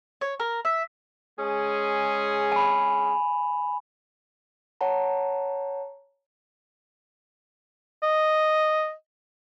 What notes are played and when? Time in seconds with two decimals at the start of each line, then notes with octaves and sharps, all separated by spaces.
0.21 C#5
0.40 A#4
0.65 E5
1.39 G#3 C#4 G#4
2.52 G#5 B5
4.81 C#5 F#5 A5 A#5
8.03 D#5